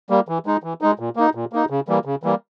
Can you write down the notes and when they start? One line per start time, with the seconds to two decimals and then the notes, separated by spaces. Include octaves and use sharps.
0.10 G3 A#3
0.28 E3
0.46 G#3 D#4
0.63 E3
0.81 G#3 D#4
0.99 A#2
1.16 A#3 D#4
1.35 A#2
1.53 A#3 D#4
1.70 C#3
1.88 E3 G3 A#3
2.05 C#3
2.23 E3 G3 A#3